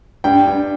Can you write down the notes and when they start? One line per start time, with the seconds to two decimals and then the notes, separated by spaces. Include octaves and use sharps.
0.24 G2 G5
0.47 G2